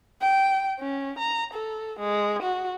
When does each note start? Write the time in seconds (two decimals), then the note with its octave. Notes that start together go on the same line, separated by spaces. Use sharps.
0.21 G5
0.80 C#4
1.19 A#5
1.54 A4
2.00 G#3
2.43 F#4